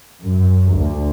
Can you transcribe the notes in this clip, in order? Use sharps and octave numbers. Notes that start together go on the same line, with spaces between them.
F#2
D2